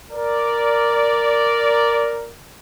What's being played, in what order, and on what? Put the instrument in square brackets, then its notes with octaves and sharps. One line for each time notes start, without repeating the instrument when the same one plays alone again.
[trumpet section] A#4 D5